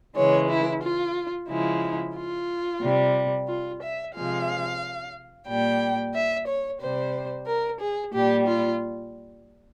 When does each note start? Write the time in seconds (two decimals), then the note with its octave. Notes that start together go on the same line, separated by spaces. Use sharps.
0.16 C#3 E3 G#3 C#5
0.50 E4
0.83 F4
1.49 C#3 F3 G#3 E4
2.15 F4
2.82 C3 G3
3.48 F4
3.82 E5
4.15 C3 F3 G#3 F5
5.48 A#2 G3 G5
6.14 E5
6.47 C#5
6.81 C3 G3 C5
7.47 A#4
7.81 G#4
8.13 A#2 G3 G4
8.47 F4